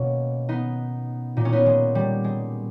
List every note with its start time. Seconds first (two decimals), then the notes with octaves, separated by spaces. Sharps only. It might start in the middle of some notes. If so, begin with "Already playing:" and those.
Already playing: B2 A#3 C#4
0.49 B3 D#4
1.37 A#2 D#4
1.45 C#4
1.52 B3 D#4
1.66 G#3
1.95 G3
2.24 G#3